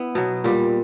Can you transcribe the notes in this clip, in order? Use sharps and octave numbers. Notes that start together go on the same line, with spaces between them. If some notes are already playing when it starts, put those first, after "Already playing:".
Already playing: B3 E4
B2 F#3
A#2 G3